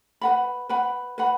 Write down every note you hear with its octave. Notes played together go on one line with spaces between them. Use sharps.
B4 F#5 B5
B4 F#5 B5
B4 F#5 B5